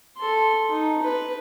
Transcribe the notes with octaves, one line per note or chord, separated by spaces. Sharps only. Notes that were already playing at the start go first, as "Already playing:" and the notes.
A4 C6
D#4
B4